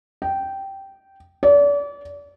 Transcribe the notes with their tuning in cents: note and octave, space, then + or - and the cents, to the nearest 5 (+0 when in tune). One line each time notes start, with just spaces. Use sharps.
G5 -10
D5 -35